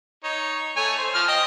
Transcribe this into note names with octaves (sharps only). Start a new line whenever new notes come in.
D#4 C#5
A3 C#5 G#5
C5
F3 F6
D#5 G5